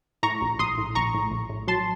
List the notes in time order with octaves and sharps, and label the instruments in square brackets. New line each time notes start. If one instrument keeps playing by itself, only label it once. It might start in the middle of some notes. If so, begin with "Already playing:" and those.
[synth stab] A2 A#5 C#6
A#1
A#1 C6 D#6
A2
A#1 A#5 C#6
A2
A#1
A2
F#3 A5 C6